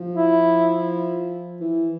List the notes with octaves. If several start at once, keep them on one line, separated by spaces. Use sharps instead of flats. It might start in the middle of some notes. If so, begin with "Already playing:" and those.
Already playing: F3
E4
E3